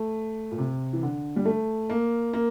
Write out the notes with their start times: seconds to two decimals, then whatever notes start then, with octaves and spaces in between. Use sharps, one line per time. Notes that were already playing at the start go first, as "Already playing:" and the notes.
Already playing: A3
0.51 A#2
0.58 C3
0.93 E3
1.03 D3
1.36 G3
1.46 A3
1.90 A#3
2.33 A#3